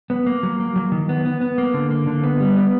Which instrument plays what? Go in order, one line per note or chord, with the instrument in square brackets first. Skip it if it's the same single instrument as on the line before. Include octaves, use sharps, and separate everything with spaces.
[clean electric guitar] B3
A#3
F#3
A#3
F#3
D#3
B3
B3
B3
A#3
D3
A#3
D3
B3
G3
B3